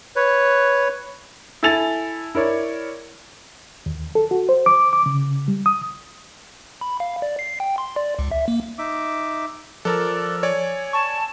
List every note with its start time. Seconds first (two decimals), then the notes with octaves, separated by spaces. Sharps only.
0.16 B4 C#5
1.63 E4 A4 G#5 A6 F7
2.35 E4 A#4 C#5 D5
3.86 D#2
4.15 A4
4.31 F#4
4.49 C5
4.66 D6
4.93 D6
5.06 C#3
5.48 G3
5.66 D#6
6.81 B5
7.00 F5
7.22 D5
7.39 C7
7.60 G5
7.78 C6
7.96 D5
8.19 C#2
8.31 E5
8.48 A#3
8.78 D#4 E5 D6
9.85 F3 A4 A#4 D5 E6 F#6
10.43 C#5 D5 G#5
10.93 A5 C#6